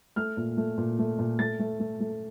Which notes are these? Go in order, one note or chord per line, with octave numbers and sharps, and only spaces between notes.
A3 F6
A#2
A3
A#2
A3
A#2
A3 A6
A3
A3
A3